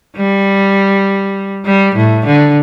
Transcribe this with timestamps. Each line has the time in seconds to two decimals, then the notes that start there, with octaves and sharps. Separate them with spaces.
0.16 G3
1.66 G3
1.96 A2
2.26 D3